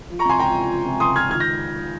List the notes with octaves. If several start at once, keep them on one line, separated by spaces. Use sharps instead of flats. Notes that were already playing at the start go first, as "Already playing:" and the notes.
F3
A#5 C#6
C3 G#5 C6
C#2 G5 A#5
C#2
F3
C3
C#2 C6 D#6
C#2 F6 G#6
D#3 F6 G#6
G6 A#6